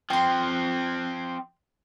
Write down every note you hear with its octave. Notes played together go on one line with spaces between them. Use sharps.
F3 C4 G5 C6